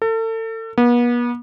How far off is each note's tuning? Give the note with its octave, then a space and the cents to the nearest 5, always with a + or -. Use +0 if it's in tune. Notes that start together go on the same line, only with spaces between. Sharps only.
A4 +35
B3 -40